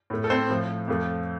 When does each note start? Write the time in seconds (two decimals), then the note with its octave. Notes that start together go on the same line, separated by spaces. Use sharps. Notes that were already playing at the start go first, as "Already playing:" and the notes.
0.10 A2 A3
0.24 A4
0.30 C4 C5
0.49 A2 F3 A3
0.88 F2 F3 A3